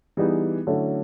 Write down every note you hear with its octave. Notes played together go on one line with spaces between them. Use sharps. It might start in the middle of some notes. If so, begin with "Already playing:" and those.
E3 G3 B3 D#4 G#4
D3 F#3 A3 C#4 E4